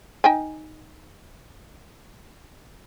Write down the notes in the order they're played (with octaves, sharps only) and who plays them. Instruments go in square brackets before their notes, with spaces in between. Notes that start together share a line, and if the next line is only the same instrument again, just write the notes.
[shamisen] D#4 G5 G#5